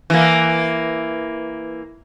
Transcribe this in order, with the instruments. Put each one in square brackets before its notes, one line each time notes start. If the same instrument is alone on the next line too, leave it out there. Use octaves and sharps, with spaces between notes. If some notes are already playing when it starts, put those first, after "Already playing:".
[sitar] E3 A#3